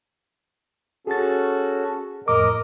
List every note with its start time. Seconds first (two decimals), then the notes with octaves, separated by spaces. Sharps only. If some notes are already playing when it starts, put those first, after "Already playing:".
1.07 C#4 F#4 G#4 A4 A6
2.28 F2 A2 A#4 D#5 D6